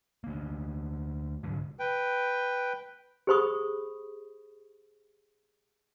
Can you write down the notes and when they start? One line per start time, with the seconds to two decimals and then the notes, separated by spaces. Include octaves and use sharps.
0.24 D2 A#3
1.43 C2 G#2 D3 F#3
1.79 B4 G5
3.27 G4 G#4 C5 B5 C#6 D#6